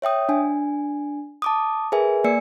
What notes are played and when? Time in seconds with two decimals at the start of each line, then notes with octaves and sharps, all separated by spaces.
0.02 C#5 E5 G5 D#6
0.29 D4 G#5
1.42 A5 D6 D#6
1.92 G#4 A#4 B4 E5 G#5
2.24 A#3 D5 G#5 E6 C#7